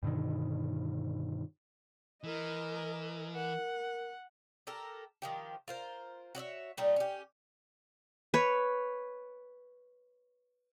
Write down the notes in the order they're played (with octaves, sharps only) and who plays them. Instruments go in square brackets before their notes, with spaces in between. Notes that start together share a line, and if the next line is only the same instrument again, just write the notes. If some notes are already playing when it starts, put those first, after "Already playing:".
[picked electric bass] G2 B2 D3 D#3
[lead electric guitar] E3 [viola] A#4 D#5
[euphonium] A#4 [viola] F#5
[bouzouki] G4 A4 A#4
D#3 F3 G4
F4 A#4 C5
F#4 C#5 D5 E5
A#2 G3 A3 D#4
C#4 G4
[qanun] B4 C#5